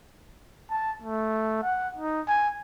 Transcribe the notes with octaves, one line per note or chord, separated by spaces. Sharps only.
A5
A3
F#5
D#4
G#5